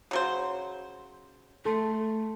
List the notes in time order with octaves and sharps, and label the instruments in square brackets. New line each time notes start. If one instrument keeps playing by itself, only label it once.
[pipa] C#3 F#3 C5
[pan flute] A3 [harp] A4 C6